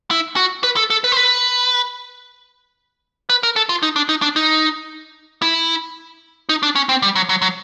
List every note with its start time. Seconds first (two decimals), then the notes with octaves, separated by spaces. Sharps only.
0.11 E4
0.36 F#4
0.64 B4
0.77 A4
0.90 A4
1.04 B4
1.12 C5
1.16 B4
3.30 B4
3.43 A#4
3.56 A4
3.69 F4
3.83 D#4
3.96 D4
4.09 D#4
4.22 D4
4.36 D#4
5.42 E4
6.49 D#4
6.63 D4
6.75 C#4
6.89 C4
7.02 G3
7.15 F#3
7.29 F#3
7.42 F#3